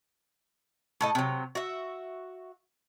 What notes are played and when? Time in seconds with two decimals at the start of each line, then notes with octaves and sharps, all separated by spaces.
1.01 A2 A4 D#5
1.15 C3 F#3
1.55 F#4 E5